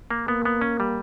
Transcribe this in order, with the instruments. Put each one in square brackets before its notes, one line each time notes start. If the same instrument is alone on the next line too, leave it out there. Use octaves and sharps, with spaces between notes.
[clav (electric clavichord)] A#3
[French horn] A#3 [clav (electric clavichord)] B3
[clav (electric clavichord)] B3
C#4
G3